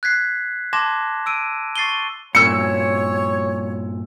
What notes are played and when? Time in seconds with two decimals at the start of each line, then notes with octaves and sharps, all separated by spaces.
0.03 F#6 G#6 B6 C7
0.73 A5 C6 D6 G#6 A#6 E7
1.26 E6 D7 D#7
1.76 C#6 A6 C7 D#7 G7
2.35 G2 A#2 C#5 E6 C#7